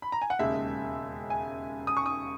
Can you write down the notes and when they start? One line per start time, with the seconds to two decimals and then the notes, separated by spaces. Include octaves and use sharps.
0.02 B5
0.12 A#5
0.22 G#5
0.30 F#5
0.39 E1 D#2 C#3 G#3 E5
1.30 G#5
1.87 D#6
1.97 C#6
2.06 D#6